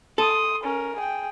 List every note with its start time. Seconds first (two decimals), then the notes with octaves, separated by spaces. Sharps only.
0.18 A4 C6 D#6
0.63 C#4 A#4
0.96 G#4 G5